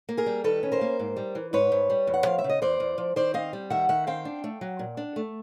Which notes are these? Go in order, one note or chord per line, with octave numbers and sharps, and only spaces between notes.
A#3
G#4 A#4
G3
D#3 A4 B4
C#4
A#4 C5
A#3
G#2
G3
E3
G#2 B4 C#5
G#2
G3
E2
F#5
F3 F5
E5
C#3
D#5
E2 C5 D5
E2
F3
D#3 C5 D5
C4 D#5 F5
G3
D#3 E5 F#5
D#3 E5 F#5
C4 F5 G5
D4
A3
F#3
A#2
D4
A3